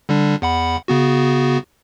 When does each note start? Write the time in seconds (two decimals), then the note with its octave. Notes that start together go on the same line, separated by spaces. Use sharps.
0.09 D3 G3 D4
0.42 E2 F#5 B5
0.88 C#3 B3 F#4